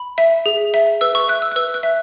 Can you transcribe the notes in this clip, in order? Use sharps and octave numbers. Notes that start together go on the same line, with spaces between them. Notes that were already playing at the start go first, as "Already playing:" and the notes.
Already playing: B5
E5
G#4
E5
B4 E6
C#6
E5 F#6
E6
F#6
B4 E6
F#6
E5